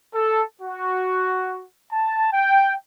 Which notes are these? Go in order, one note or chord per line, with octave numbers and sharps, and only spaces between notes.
A4
F#4
A5
G5